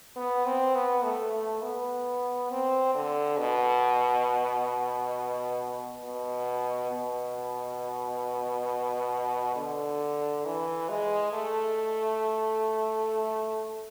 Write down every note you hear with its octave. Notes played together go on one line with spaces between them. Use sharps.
B3
C4
B3
A3
A3
B3
C4
D3
B2
B2
B2
D3
E3
G#3
A3